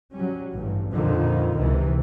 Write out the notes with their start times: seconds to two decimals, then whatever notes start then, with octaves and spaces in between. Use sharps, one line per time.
0.13 F#3 G3 C#4
0.55 A1 G2
0.92 F2 A#2 D3 D#3 F3
1.57 C#2 C3 D#3 E3